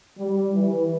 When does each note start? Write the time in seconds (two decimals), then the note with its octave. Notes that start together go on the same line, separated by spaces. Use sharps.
0.18 G3
0.54 E3